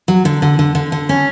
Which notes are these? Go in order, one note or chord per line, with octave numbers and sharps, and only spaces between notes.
F#3
D3
D3
D3
D3
D3
C#4